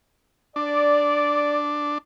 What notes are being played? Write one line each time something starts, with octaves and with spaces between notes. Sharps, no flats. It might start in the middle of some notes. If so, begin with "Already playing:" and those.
D4 D5